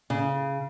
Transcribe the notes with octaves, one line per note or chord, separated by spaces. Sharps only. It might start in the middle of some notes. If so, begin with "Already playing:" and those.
C#3